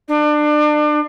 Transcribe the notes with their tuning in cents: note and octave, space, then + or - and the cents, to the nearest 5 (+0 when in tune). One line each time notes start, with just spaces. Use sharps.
D4 +30